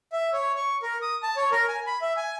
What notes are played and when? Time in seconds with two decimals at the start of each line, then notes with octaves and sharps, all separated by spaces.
0.12 E5
0.33 C#5
0.57 C#6
0.82 A#4
1.02 D#6
1.23 A5
1.37 C#5
1.52 A#4
1.69 G#5
1.87 B5
2.02 E5
2.17 G#5